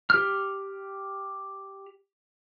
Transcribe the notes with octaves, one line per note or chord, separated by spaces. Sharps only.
G4 F6